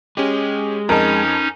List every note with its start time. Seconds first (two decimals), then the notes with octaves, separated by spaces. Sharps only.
0.17 G#3 C#4 G4
0.89 F2 C#4 D#4 A#4 D#5 A5